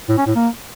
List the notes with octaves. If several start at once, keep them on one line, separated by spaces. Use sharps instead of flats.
A2
C#4
A2
A#3